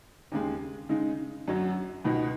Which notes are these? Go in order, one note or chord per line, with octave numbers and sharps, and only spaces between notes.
D#2 C#3 G#3
C#3 G#3 D#4
F#2 F#3 C#4
C#2 B2 B3 D#4